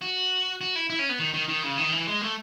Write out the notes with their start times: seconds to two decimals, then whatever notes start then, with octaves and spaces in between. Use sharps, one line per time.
0.02 F#4
0.61 F#4
0.76 E4
0.90 E4
0.99 C#4
1.09 B3
1.19 D#3
1.34 D#3
1.48 D#3
1.63 C#3
1.78 D#3
1.92 E3
2.07 G#3
2.22 A3